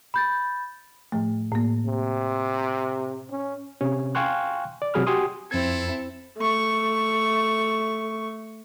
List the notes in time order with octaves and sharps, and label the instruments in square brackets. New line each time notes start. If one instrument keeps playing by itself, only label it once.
[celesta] B5 G6 A6
[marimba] A2 F3 A3
A2 A#3
[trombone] C3
C#4
[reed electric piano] C3 C#4
F5 G5 G#5 C6 C#6 F#6
D5
C3 F#3 G#4 B5 F6
F#4 G4 G#5 C6 D#6
[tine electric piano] F2 G#6 [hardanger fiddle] C4 E4 [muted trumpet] A4
[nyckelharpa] A3 C#6